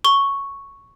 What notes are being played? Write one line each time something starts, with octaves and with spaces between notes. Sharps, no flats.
C#6 G7